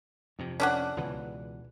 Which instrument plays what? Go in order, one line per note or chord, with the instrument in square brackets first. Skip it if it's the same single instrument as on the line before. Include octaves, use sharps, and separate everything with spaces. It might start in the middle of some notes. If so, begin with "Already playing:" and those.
[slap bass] F2 C3
[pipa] C#4 D4 F#5
[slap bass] C#2 B2 E3